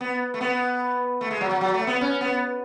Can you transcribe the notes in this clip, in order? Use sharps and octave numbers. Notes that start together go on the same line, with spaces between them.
B3
A3
B3
A3
G#3
F#3
F#3
F#3
A3
B3
C#4
B3